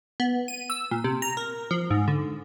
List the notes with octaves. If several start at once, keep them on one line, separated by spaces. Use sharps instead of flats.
B3
D#7
E6
A#2
C3
A#5
A#4
F3
G#2
D3